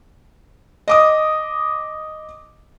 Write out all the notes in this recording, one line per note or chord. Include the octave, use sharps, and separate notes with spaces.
D#5 D6 D#6